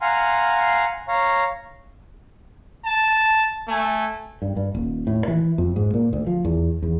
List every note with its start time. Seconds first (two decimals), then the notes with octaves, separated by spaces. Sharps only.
0.02 F5 F#5 G#5 A#5 C6 F6
1.08 C#5 F5 A#5
2.85 A5
3.68 A3 G#5
4.42 G2
4.56 G2
4.75 D#1
5.07 A2
5.28 E3
5.58 F2
5.76 G#2
5.94 A#2
6.13 D2
6.27 F3
6.45 E2
6.82 E2